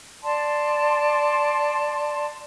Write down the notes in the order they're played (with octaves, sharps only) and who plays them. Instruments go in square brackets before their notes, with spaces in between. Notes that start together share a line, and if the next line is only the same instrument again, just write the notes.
[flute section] D5 A5 C6